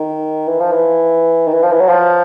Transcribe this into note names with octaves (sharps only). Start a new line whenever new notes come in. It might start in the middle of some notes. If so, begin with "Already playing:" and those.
Already playing: D#3
E3
F3
E3
D#3
E3
F3
E3
F#3
F3